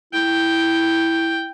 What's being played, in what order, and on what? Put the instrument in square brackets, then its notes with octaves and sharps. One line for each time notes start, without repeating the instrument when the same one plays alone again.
[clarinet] E4 [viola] G5